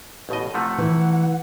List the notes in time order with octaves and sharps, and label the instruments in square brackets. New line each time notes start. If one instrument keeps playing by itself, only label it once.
[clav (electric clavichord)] A1 B2 D#5
[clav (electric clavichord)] C3 F3 A3 [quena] F#5
[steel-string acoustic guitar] E3